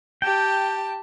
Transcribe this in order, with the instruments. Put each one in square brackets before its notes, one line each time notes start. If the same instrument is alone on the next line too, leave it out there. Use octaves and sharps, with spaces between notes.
[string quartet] G4 A5 [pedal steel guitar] G5